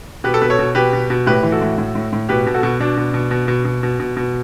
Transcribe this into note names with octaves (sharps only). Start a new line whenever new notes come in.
B2 G4 B4
A4
B2 B4
A4 C#5
B2
B2 G4 B4
B2
B2
A2 G4 B4
E3
F#4 A4
A2
A2
A2
A2
B2 G4 B4
B2
F#4 A4
B2
B2 D4
B2
B2
B2
B2
B2
B2
B2
B2